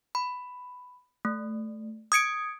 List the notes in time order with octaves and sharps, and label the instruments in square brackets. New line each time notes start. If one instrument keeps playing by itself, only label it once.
[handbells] B5
A3
D#6 G#6 C#7 D7